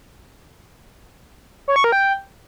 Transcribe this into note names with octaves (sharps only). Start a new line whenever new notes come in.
C#5
C#6
A#4
G5